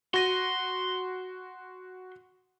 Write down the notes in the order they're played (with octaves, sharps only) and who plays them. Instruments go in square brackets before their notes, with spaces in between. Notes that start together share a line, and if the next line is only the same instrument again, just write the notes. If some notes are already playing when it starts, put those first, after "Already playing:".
[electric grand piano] F#4 A#6 D#7 [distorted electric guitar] C6